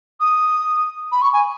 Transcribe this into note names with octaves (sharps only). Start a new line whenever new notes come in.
D#6
B5
C#6
G#5